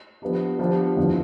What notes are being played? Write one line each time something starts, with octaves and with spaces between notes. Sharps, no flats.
F3 B3 D4 G4
F3 B3 D4 G4
E2 D3 F3